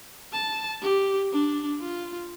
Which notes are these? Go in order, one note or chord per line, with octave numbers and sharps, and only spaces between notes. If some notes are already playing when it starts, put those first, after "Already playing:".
A5
G4
D4
F4